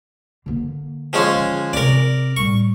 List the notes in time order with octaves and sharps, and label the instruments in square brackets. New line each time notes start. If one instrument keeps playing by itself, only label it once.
[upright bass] D3 A#3
[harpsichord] F3 G#3 C#4
[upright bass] D3
[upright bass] C3 C4 [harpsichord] A#4 D5
[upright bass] A2 G3 [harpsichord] C#6